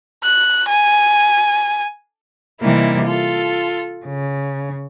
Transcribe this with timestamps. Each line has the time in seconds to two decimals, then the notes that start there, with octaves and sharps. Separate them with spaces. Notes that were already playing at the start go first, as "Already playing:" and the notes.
0.23 F#6
0.68 G#5
2.61 C3 E3 G3 A#3 D#4 E4
3.06 F4 A4
4.06 C#3